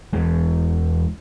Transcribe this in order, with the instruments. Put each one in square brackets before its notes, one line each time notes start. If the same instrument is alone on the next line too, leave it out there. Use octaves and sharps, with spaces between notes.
[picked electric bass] E1 E2 G#3